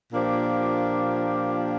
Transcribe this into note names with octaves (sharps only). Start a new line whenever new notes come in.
A#2 F3 A#3 D4 G4